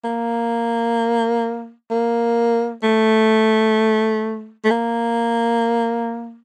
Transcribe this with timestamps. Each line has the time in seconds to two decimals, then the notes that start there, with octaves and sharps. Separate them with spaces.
0.04 A#3
1.91 A#3
2.83 A3
4.64 A3
4.70 A#3